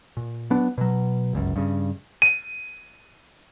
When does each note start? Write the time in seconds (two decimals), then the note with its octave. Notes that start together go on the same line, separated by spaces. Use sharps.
0.17 A#2
0.50 F#3 B3 D4
0.78 B2 F#3
1.33 G1 C#2 F#2
1.56 G2 C#3
2.22 D#7